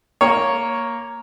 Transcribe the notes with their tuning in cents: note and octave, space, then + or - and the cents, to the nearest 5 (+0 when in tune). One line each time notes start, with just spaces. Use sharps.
A#3 +0 C#5 +0